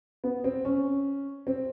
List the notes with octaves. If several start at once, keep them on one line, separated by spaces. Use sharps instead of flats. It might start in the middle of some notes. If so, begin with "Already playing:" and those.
B3
C4
C#4
C4